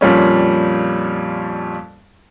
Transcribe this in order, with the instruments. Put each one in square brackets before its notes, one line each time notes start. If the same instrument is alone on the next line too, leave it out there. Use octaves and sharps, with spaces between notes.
[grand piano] F2 A#2 G3 C#4